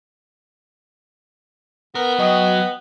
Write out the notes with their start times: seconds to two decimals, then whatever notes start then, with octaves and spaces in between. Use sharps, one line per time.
1.95 B3 A#4
2.19 F#3 D#5 G5 D#6